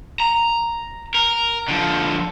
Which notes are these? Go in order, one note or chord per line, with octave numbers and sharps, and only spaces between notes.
A#5
A#4
D3 F3